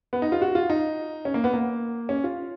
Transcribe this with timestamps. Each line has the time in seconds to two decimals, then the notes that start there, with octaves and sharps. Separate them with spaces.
0.13 B3
0.22 D#4
0.32 F4
0.42 F#4
0.55 F4
0.70 D#4
1.25 C#4
1.34 A#3
1.44 B3
1.53 A#3
2.09 C#4
2.24 F4